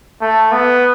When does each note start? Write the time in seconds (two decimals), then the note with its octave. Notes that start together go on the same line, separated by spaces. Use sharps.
0.21 A3
0.52 B3